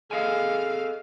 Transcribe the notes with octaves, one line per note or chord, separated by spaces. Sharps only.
G#4 A4 D#5 F5 G#5